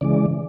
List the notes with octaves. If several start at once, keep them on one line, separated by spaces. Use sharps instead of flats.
C#3 E3 G#3 D5